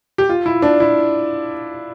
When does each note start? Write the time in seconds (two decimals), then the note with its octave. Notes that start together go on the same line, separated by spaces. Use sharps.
0.18 G4
0.29 F4
0.46 E4
0.62 D4
0.80 E4